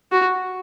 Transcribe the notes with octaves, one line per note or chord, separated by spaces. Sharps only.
F#4